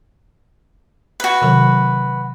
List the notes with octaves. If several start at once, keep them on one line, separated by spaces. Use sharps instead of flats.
F#4 B4
C3 D#3 F#3